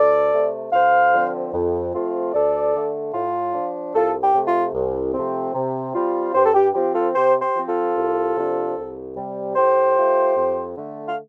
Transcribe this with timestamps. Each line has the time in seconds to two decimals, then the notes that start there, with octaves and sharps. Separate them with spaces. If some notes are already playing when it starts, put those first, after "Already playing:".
Already playing: D2 A4 D5
0.33 C3 A3
0.73 D2 C5 F5
1.13 D3 F3 C4
1.53 F2
1.93 F3 A3 C4 F4
2.33 D2 A4 D5
2.74 D3 A3
3.14 A2 F4
3.54 F3 D4
3.94 C2 F4 A4
4.21 G4
4.34 C3 A3
4.47 F4
4.74 C2
5.14 C3 F3 A3 C4
5.54 C3
5.94 G3 C4 F4
6.34 G2 G4 C5
6.46 A4
6.55 G4
6.75 F3 C4 F4 G4
6.95 F4 A4
7.15 C3 G4 C5
7.42 G4 C5
7.55 F3 C4
7.68 F4 A4
7.96 C2
8.36 C3 F3 D4 F4
8.76 C2
9.16 C3 G3
9.56 A2 G4 C5
9.96 A3 F4
10.36 F2
10.76 D3 A3
11.08 F5